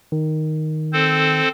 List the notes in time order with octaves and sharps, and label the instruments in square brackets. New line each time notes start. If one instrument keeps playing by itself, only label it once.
[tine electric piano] D#3
[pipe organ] C4 A4 C5